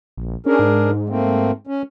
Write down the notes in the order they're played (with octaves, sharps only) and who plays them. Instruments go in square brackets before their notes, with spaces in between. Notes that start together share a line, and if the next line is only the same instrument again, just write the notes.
[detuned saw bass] A#1
[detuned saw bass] C#4 [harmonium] D4 G#4 A#4
[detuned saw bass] G#2
[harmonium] A3 A#3 C4
C#4